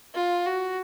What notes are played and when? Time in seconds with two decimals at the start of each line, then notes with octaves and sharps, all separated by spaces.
0.14 F4
0.46 F#4